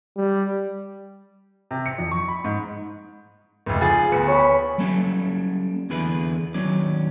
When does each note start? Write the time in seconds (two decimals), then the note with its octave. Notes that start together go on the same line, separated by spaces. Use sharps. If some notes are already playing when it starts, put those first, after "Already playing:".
0.17 G3
1.71 C3
1.86 C#7
1.98 F2
2.11 C#6
2.28 B5
2.45 G#2
3.66 F1 C#2
3.81 F3 G#4 G#5 A6
4.12 D2 B3 C#7
4.28 C#5 B5
4.78 F#3 G3 A#3 C#4 A4
5.90 E2 D3 E3 G#4 B4
6.54 D#2 F#3 C#4 D5